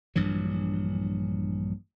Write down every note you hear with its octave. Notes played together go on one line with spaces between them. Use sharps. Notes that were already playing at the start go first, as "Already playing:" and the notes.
A#1 G2 E3 F#3